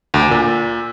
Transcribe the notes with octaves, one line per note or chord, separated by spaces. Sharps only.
D2
A#2